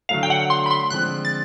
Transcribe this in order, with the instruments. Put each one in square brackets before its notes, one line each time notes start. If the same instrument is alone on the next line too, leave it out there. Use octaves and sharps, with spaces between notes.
[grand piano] D3 F#3 A3 [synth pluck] F5
[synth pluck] G5
F#5
C6
B5
C6
[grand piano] D3 F3 G#3 C4 [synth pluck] F#6
[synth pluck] A6